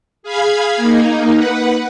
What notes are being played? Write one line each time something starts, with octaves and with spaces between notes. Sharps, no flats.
G#4 F5 B5 G#6
A#3 D#4
B4 F#5